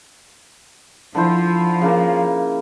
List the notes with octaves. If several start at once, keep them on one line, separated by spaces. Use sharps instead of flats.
D3 F3 E4 C5
C#3 A#3